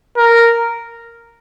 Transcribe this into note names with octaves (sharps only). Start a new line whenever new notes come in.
A#4